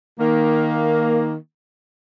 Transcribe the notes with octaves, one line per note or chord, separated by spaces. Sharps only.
D#3 A#3